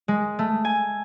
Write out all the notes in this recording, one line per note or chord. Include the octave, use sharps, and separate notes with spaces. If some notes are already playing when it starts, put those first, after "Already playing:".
G#3
A3
G#5